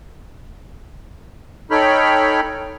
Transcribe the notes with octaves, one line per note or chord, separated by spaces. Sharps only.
D#4 A4 C#5 G5 B5 F6